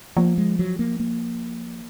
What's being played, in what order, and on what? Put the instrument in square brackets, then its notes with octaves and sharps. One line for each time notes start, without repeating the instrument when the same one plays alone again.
[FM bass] F3 [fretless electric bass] A#3
[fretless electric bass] G#3
F#3
A#3
A#3